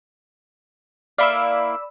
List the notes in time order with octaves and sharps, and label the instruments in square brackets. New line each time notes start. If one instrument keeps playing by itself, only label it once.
[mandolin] A#3 E4 F5 [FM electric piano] D5 B5 E6